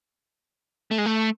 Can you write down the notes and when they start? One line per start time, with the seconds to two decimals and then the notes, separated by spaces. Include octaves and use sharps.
0.91 A3
0.98 G#3
1.06 A3